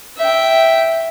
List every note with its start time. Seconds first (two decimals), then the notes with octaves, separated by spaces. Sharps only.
0.18 E5 G5